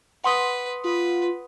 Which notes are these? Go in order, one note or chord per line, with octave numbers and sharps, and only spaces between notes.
B4 F#5 C6 D#6
F4 B4